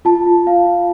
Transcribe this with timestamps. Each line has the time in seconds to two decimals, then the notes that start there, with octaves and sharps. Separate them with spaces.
0.05 F4 A5
0.26 F4
0.47 F4 F5
0.66 F4